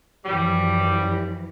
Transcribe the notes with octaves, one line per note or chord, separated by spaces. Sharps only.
F#2 E3 F3 G3